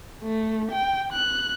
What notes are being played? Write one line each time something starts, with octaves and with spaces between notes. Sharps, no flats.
A3
G5
F#6